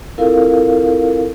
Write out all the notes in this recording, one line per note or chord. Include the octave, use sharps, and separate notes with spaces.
C4 E4 F4 A4 A#4 F5